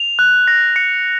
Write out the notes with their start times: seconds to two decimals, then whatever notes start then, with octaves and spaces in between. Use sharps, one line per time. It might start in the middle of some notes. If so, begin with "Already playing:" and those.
Already playing: F7
0.19 F#6
0.48 A#6
0.76 C#7